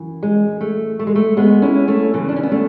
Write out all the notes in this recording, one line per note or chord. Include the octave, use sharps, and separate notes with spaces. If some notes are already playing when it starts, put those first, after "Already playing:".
Already playing: F#2 E3
G#3
A3
A3
G#3
A3
G#3 B3
C#4 E4
A3 C#4
F#2 C#3 E3
D4
C#4
B3
A3